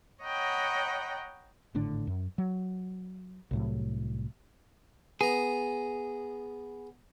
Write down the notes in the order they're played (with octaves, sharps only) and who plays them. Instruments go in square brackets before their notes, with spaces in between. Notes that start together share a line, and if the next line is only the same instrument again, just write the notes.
[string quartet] C#5 D#5 F#5 G5 A#5 B5
[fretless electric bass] G#1 A2 D3 D4
F#2
F#3
C2 A2 F#3
[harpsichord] B3 A#5 [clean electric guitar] G#4